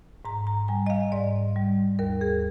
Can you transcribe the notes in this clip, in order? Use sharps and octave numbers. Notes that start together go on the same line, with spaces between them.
G#2 A#5
A#5
G3 G#5
D#5
F5
G#2 D5
G3
D#2 A#4
G#4